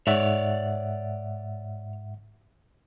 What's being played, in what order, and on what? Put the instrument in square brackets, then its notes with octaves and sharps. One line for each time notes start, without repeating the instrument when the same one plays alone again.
[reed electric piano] G#2 E5 F#5 [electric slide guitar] C#5 D5